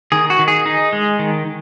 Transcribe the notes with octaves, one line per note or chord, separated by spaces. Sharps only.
D#3 G#4
F#4
D#3
G#4
D#4
G#3
D#3